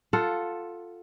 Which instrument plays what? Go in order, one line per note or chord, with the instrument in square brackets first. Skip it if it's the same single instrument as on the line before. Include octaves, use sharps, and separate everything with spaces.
[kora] F4 A4 F#5